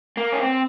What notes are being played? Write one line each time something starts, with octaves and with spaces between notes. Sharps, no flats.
A#3
C#4
C4